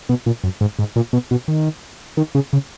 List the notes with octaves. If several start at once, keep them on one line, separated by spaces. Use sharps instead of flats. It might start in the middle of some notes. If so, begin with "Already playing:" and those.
B2
A#2
F#2
G#2
G#2
A#2
B2
B2
D#3
D#3
C#3
C#3